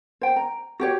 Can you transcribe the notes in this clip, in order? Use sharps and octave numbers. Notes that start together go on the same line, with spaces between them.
C5 G5
A#5
F#4 G4 C#5